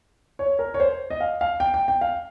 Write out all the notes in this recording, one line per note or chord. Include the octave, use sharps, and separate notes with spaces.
C#5
A#4
C#5
C5
D#5
F5
F5
G5
G5
G5
F5